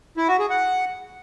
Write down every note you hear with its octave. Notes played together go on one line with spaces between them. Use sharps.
E4
F#4
G#4
F#5